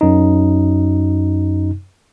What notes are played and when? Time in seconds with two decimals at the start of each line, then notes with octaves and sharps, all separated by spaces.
0.01 F#2 D#4